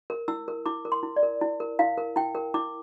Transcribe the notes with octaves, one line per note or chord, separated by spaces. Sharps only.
A#4
E4 E6
A#4
E4 D6
A#4
C6
E4
D5
A#4
E4
A#4
E4 F5
A#4
E4 G5
A#4
E4 D6